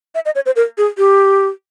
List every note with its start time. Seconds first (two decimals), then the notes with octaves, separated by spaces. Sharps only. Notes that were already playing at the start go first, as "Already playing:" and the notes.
0.15 E5
0.25 D#5
0.35 C#5
0.46 C5
0.56 A#4
0.78 G#4
0.98 G4